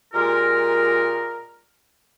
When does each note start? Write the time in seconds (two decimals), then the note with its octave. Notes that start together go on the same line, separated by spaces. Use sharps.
0.14 A#2 G#3 F4 G4 A#4